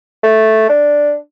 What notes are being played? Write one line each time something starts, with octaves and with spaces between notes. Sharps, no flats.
A3
D4